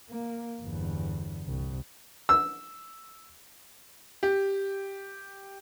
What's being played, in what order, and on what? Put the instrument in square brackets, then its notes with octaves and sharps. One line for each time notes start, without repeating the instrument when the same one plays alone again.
[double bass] A#3
G1 E2
C2
[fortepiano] E6
[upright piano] G4